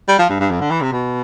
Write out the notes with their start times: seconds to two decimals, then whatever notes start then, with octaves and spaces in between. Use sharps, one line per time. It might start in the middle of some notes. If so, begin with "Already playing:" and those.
0.09 G3
0.19 F3
0.29 G2
0.40 G2
0.51 F2
0.61 D3
0.71 E3
0.81 C3
0.92 B2